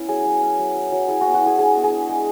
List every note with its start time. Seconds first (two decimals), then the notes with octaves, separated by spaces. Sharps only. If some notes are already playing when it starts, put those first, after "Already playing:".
Already playing: B3 C#4 E4 B4
0.08 F#3 G#4
0.25 F#3
0.42 C#4
0.59 F#3
0.76 F#3
0.92 F#3
1.08 E4 G#4
1.21 B3 F#4
1.34 F#4
1.42 E4 G#4
1.59 D4 G#4
1.75 B3
1.84 G#4
1.92 D4
2.09 G#3